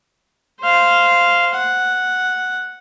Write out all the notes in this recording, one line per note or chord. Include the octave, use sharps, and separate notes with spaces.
C5 F5
F#5